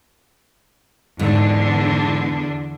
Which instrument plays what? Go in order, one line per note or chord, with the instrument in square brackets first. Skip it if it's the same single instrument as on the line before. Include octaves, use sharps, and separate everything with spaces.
[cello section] E2 D3 D4 [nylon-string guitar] G#2